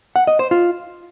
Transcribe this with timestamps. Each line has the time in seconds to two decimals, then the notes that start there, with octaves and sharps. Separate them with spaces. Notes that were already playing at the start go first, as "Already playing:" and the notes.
0.16 F#5
0.27 D#5
0.39 C5
0.51 F4